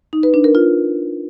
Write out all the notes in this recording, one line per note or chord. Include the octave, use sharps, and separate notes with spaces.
D#4
B4
D4
A#4
F4